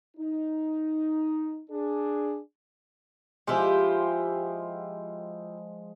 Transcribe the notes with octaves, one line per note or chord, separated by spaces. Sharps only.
D#4
D4 G#4
F3 G#3 E4 F4 G4